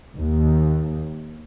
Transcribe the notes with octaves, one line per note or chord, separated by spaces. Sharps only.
D#2